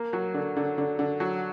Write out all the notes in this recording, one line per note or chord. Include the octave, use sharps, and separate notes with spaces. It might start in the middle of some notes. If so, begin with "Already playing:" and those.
Already playing: A#3
F#3
D3
D3
D3
D3
F#3